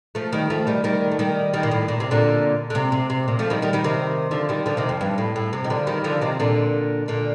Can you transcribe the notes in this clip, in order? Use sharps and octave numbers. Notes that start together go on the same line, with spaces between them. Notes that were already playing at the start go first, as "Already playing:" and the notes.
F3 A3
D#3 G3
F3 A3
D#3 G3
D#3 G3
A3
D#3 G3
D#3 G3
A#2
A2
A#2
C3
A#2 D3
D3
C3
C3
C3
A#2
F3 A3
D#3 G3
D#3 G3
D#3 G3
C3 D#3
D3 F3
D#3 G3
D3 F3
C3 D#3
F2
G2
A2
A2
C3
D#3
D3 F3
D#3 G3
D3 F3
C3 D#3
A#2 D3
A#2 D3